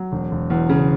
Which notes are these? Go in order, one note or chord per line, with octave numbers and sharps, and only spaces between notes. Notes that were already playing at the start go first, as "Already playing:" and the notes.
Already playing: F#3
E1
E1
E2
C#3